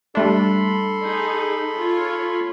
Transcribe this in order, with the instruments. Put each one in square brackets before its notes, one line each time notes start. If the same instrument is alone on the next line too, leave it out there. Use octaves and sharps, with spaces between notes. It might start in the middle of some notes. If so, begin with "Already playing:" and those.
[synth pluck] G3 A3 D4 [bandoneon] A4 B5 C6
[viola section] D#4 G#4
F4 C#5